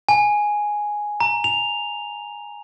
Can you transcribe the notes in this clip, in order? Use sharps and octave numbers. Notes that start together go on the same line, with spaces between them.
G#5
A#5
F7